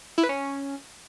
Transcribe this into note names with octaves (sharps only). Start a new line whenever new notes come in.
E4
B4
C#4